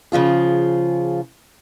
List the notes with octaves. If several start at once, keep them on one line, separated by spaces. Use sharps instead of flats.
C#3 F3 F4 G#4